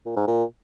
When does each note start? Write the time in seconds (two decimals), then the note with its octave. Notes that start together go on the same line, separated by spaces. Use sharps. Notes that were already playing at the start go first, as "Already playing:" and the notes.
0.06 A#2
0.16 G#2
0.27 A#2